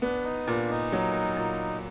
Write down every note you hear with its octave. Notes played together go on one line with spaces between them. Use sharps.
B3 D4
D#4
A#2 D4
D#4
F#3
A#2